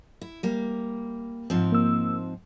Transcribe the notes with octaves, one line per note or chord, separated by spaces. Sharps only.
E4
G3 A#3
G#2 F3 C4
A#3 E6